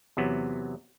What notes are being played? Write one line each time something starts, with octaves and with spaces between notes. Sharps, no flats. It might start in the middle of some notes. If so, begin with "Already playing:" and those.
E2 C3 F#3 B3